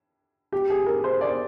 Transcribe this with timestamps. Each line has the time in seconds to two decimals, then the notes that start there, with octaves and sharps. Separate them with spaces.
0.52 G4
0.70 G#4
0.86 A#4
1.04 C5
1.21 D5